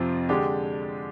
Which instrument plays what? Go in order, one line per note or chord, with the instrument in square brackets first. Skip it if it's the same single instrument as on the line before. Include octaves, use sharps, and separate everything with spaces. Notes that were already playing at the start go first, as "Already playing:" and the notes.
Already playing: [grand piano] F2 C3 F3 C4
D3 G#3 D4 G4